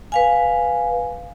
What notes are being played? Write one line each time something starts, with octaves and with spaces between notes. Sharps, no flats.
B4 F5 G#5